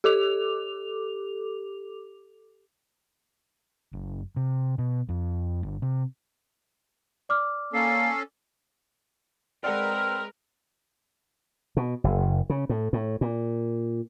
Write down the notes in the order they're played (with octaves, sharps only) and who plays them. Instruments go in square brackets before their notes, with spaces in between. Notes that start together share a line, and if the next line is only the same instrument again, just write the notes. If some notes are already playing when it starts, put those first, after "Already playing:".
[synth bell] G4 A4 D6 F7
[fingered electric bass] F#1
C3
B2
F2
G1
C3
[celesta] D5 D6 F6
[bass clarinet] A#3 [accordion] C#4 A4 [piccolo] C7
[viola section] G#3 A#4 B4 [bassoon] C4 [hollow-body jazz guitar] D5 F#5 [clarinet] F6
[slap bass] B2
F#1
C#3
A2
A2
A#2